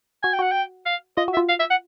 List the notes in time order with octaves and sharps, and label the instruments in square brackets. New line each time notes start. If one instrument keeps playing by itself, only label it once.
[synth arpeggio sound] F#4 [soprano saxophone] G#5
[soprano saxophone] G5
[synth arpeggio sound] F#4 [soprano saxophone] F#5
[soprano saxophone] G5
F5
[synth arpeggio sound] F4 [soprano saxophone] D#5
[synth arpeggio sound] F#4
[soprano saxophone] E5
[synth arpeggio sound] F4
[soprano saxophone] F5
E5
F#5